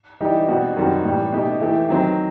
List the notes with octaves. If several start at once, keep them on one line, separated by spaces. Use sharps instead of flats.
E3 G3 D#4 G4
B2 G3 C4 D#4 F#4
F#2 D#3 G3 C4 F#4
A2 E3 G3
B2 A3 D#4 G4
E3 A3 E4 G4
D#3 F#3 C4